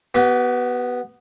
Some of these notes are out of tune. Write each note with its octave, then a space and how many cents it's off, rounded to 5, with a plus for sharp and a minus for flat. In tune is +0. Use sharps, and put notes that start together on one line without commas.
B3 +0 G4 -45